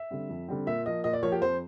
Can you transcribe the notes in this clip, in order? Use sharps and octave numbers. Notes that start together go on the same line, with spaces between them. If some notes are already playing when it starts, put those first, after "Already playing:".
Already playing: E5
D3 G3 C4
F2
D3 G3 C4
A#2 E5
F3 A#3 D#5
A#2 D#5
D5
F3 A#3 C#5
G4
F2 C5